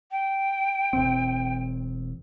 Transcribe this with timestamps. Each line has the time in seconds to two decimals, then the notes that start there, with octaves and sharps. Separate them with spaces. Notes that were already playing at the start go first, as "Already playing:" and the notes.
0.11 G5
0.93 E1 C4